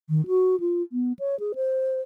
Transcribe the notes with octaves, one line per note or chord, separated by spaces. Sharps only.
D#3
F#4
F4
B3
C#5
G#4
C5